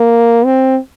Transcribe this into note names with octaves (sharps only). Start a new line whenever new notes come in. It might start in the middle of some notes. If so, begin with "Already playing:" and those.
Already playing: A#3
C4